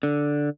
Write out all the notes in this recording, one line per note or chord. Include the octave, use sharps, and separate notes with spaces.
D3